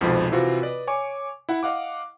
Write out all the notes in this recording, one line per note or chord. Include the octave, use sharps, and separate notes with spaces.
C2 F2 G#2 B2 F3
C3 E3 C4 F4 F#4
B4 D5 D#5
C#5 G#5 C#6 D6
E4 F#5
D#5 F5 F#5 D6